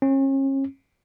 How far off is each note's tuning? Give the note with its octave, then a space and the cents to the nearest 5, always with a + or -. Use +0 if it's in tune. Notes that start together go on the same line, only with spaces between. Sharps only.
C#4 -35